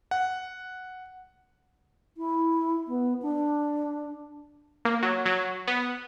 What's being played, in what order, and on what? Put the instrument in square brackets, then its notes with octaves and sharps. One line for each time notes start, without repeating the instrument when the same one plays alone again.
[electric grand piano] F#5
[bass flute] E4
B3
D4
[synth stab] A#3
F#3
F#3
B3